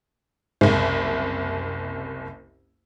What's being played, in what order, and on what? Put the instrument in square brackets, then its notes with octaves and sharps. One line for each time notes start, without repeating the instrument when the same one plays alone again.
[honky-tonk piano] F#1 C2 [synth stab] G#2